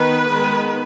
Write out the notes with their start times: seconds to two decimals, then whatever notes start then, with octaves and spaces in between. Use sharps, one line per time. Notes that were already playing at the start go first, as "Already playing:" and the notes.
Already playing: D#3 B3 B4
0.31 D#3 G#3 B3